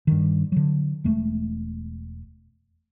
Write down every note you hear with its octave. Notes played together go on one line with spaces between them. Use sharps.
G2 D#3
D3 F#3
E1 G#3 A3